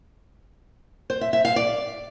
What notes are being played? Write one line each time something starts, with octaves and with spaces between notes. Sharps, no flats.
C5
E5
E5
F5
D5